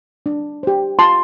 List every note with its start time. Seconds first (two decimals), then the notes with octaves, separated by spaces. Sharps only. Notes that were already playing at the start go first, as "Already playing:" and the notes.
0.26 D4
0.63 G4 C5
0.99 F4 A5 C6